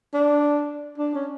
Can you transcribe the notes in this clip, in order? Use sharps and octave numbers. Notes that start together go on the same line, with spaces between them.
D4
D4
C#4